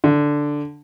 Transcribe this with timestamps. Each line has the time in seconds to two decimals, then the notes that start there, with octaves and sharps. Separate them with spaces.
0.04 D3